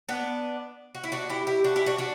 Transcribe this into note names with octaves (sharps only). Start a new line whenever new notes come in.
B3 D4
F#4
E4
D4 F#4
E4 G4
E4 G4
D4 F#4
E4 G4
D4 F#4
D4 F#4